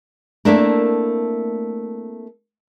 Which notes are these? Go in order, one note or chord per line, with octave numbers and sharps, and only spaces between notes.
A3 A#3 C4 D4 E4 A#4